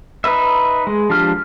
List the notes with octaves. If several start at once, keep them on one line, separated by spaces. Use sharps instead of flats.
D#4 B4 E5
G#3
F3 D4 G4 F6